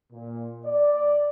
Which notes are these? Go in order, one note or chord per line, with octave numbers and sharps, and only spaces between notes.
A#2
D5